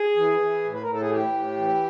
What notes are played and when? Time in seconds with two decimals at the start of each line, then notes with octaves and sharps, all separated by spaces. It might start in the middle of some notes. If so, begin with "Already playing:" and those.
Already playing: G#4
0.16 E3
0.40 E3
0.64 A2
0.73 B4
0.82 A#4
0.87 A2
0.92 A4
1.01 G#4
1.09 E3 G4
1.33 A2
1.57 E3